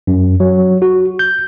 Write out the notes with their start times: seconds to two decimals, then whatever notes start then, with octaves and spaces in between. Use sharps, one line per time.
0.07 F#2
0.40 F#3
0.82 F#4
1.19 G6